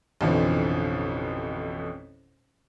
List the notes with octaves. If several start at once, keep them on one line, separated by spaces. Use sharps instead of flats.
A1 F2 B2 D3 E3